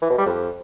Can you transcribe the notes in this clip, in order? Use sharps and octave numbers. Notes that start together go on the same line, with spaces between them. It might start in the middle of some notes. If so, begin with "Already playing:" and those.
E3
B2
G3
F2